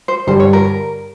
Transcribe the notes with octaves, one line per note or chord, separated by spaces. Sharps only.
C5
G2 D3 G3 C5
C#5
A#4